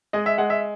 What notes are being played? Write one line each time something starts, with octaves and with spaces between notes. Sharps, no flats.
G#3 D#5
E5
G#3 F#5
E5